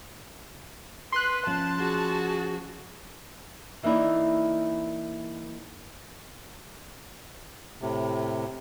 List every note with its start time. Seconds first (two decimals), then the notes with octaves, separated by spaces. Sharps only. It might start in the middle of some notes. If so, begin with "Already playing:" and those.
1.12 B4 C6 F#6
1.47 F3 C#4 A5
1.79 F#4 G#4
3.83 E3 A#3 D#4 E4 D5
7.82 A2 C3